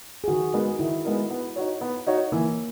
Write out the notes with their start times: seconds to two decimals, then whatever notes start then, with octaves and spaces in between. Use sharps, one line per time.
0.24 G#4
0.28 D#3 F#4
0.53 G#3 B3 D#4 A#4
0.79 D#3 E4
1.05 G#3 B3 D#4 A#4
1.30 B3
1.56 D#4 F#4 C#5
1.81 B3
2.07 D#4 F#4 C#5
2.32 E3 A#3